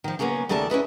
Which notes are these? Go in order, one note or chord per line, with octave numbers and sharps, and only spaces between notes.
D#3 F3
C#3 F#3 A#3 B3 C#4
D#2 C#3 A3 A#4 D5 A5
C#4 E4 B4 D#5